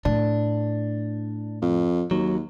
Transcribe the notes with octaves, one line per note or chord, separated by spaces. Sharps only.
A2 D4
F2
D#2 F#3